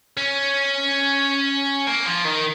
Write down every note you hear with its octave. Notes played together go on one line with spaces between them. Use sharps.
C#4
A#3
F3
D#3